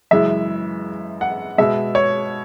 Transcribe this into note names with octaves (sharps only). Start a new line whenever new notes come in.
F#2 C#3 E3 G#3 E5
F#5
B2 G#3 E5
C#5